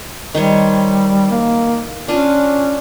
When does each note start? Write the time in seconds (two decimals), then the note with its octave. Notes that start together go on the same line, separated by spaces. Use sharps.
0.35 D#3 G3 C5 C#5
1.31 A#3
2.08 C#4 D4 F4 G#5